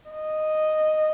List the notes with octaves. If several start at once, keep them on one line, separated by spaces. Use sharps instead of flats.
D#5